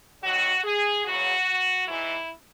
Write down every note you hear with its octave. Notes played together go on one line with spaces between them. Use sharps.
D#2 D#3 F#3 F#4
G#4
E2 C#3 F#3 F#4
G#2 E3 E4